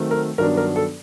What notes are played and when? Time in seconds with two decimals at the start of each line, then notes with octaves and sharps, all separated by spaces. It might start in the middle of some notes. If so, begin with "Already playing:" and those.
Already playing: D#3 F#3 A3 C4
0.11 A#4
0.38 G2 D#3 F#3 B3 D4 A#4
0.57 A#4
0.76 A4